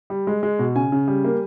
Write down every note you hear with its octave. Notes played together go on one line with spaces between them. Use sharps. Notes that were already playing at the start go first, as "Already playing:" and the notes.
G3
G#3
G#3
B2
C#3 G#5
C#3
G3
A#3